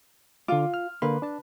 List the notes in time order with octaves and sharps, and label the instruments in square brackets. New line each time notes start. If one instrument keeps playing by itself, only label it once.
[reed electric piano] D3 D6 [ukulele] F4
[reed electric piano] F6
[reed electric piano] D3 A#3 C6 [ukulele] B4
[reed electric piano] D4 A5